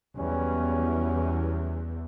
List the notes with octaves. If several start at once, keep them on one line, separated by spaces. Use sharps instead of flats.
E2 F#3 G3 C#4